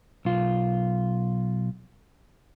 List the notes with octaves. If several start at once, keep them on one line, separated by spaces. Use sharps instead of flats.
B1 F4